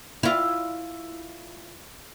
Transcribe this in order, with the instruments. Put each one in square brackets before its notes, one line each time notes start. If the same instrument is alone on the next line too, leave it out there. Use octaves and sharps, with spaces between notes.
[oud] E4 F4